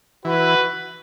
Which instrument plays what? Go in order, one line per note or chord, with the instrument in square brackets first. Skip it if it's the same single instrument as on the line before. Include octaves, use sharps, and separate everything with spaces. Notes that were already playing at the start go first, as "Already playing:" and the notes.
[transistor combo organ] E3 [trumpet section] F#4 B4